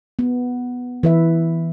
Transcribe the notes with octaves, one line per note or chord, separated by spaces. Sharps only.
B3
E3 B4 E5